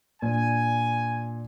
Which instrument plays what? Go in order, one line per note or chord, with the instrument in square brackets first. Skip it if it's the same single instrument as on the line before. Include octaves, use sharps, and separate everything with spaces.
[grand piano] A#2 D4 [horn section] G#5